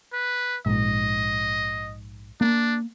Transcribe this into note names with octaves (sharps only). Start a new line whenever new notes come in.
B4
A#1 G#2 D#5
A#3 D4